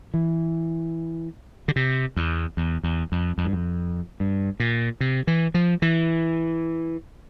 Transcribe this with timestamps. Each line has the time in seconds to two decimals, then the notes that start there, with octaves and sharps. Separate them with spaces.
0.14 E3
1.68 D3
1.76 C3
2.17 E2
2.57 E2
2.84 E2
3.12 F2
3.38 F2
3.45 G2
3.53 F2
4.20 G2
4.60 A#2
5.01 C3
5.27 E3
5.54 F3
5.82 E3